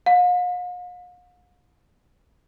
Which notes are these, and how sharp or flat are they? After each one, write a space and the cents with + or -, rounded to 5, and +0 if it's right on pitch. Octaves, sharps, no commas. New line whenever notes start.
F5 +45